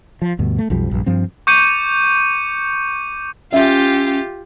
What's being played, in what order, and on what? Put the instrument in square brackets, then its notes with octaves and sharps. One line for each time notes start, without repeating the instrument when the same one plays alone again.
[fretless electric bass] F3
D2 G2 B2
A3
B1 F2 F3 G3
A#1 G2
G2 F3 C4
[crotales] C#6 D6 G6 C#7 D#7
[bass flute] C#4 [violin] F4 G4 [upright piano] E5